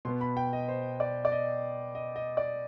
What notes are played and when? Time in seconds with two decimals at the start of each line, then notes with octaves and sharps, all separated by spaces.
0.05 B2 C6
0.08 B3
0.21 B5
0.37 G5
0.53 D#5
0.68 C5
1.00 D5
1.25 D5
1.32 D#5
1.95 D#5
2.16 D#5
2.37 D5